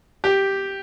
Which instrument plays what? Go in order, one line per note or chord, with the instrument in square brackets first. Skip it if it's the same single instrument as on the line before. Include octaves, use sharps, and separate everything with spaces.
[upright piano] G4